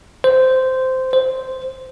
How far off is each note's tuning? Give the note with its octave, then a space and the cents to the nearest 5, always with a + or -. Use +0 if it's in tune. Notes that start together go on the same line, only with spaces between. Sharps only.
C5 -10
C5 -5